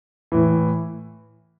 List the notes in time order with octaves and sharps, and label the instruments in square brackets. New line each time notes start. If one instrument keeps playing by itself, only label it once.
[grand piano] A2 E3